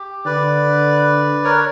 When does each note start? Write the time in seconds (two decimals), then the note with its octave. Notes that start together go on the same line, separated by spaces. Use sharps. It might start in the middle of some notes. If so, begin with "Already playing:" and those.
Already playing: G4
0.25 D3 B4 D5
1.44 A#4 C#5